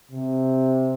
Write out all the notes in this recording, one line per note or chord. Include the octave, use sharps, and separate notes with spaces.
C3